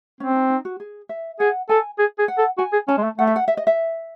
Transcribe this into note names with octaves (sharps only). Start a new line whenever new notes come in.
C4 C#4
D#4
D#4
F#4
G#4
E5
G#4 F#5
A4 G#5
G#4
G#4
F#5
A4
F#4 G#5
G#4
C#4 A5
G#3
A3
A3 F#5
E5
F#5
E5
D#5
E5